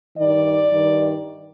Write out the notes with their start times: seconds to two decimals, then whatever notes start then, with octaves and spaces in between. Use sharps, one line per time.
0.17 G2 D#3 D5
0.72 G2 D#3